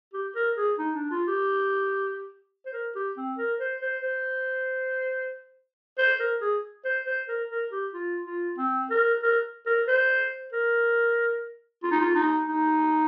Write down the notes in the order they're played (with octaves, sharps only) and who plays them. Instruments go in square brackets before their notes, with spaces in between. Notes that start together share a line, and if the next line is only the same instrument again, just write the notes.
[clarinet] G4
A#4
G#4
D#4
D4
F4
G4
C5
A#4
G4
C4
A#4
C5
C5
C5
C5
A#4
G#4
C5
C5
A#4
A#4
G4
F4
F4
C4
A#4
A#4
A#4
C5
A#4
F4
D#4
F4
D#4
D#4